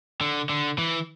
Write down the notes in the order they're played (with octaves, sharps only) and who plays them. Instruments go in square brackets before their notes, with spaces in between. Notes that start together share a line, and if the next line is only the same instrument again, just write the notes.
[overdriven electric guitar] D3
D3
E3